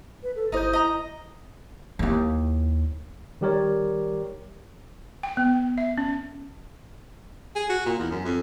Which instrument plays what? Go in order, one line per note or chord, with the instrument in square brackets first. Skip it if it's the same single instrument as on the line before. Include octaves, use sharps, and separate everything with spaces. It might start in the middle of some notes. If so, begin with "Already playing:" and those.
[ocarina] B4
A4
[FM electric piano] G1 C5 G6 [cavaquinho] D#4 D#5 [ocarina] E4
[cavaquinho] D#5 A#5 [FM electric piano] D#6
[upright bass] D#2 E4
[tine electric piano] D#3 G3 G4 A#4 C#5 D5
[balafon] G5
B3
E5
C#4
[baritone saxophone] G#4
F#4
A#2
E2
F#2
F2